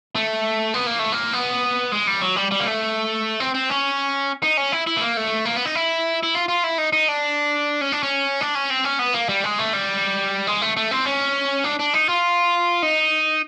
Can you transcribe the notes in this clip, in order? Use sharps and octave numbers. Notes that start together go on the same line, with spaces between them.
A3
B3
A#3
A3
A#3
B3
G#3
G3
F#3
G3
G3
A#3
A3
C4
C4
C#4
D#4
C#4
E4
E4
A3
A#3
A3
A#3
B3
D#4
E4
E4
F4
F4
E4
D#4
D#4
D4
C#4
D4
C#4
D4
C#4
C4
C#4
B3
A#3
G3
G#3
A3
G3
G#3
A3
A3
C4
C#4
D4
D4
D#4
F4
D#4